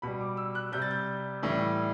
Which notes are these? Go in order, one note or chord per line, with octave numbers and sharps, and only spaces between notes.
B2 G3 B5
D6
E6
F#6
C3 G3 G6
A6
G6
A2 E3 G3